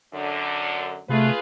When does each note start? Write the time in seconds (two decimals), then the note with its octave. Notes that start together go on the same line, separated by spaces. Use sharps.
0.14 F#2 D3
1.09 C3 A3 F4 G#4 B4